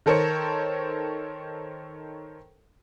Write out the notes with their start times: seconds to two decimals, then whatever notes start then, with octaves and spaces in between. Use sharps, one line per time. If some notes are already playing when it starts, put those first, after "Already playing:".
0.06 D#3 A4 A#4 C5 C#5 C#7